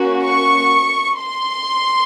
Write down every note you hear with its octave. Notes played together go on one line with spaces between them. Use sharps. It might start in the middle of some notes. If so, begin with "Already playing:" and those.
Already playing: A#3 C#4 F#4
C#6
C6